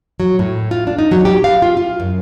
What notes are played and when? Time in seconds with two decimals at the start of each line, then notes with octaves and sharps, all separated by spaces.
0.20 F#3
0.39 A2
0.71 F4
0.87 D4
0.99 D#4
1.11 F#3
1.25 G4
1.44 F5
1.62 F4
1.77 F4
2.00 F#2